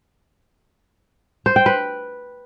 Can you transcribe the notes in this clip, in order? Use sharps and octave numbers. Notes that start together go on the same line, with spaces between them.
C5
G5
B4